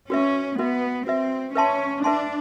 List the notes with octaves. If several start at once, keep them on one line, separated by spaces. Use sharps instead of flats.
C#4 F#4 B4 E5
B3 F#4 B4 E5
C4 F#4 B4 E5
C#4 B4 E5 A5 C6
D4 B4 E5 A5 C6